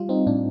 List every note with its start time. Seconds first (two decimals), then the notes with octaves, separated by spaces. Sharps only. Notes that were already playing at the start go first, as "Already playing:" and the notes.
Already playing: G3 F4
0.09 C4 D#4
0.27 A2 D4